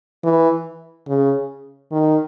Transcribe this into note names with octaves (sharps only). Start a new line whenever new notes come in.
E3
C#3
D#3